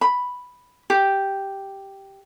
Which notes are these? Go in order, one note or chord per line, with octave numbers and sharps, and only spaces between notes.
B5
G4